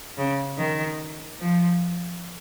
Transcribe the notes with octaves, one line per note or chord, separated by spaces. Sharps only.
C#3
D#3
F3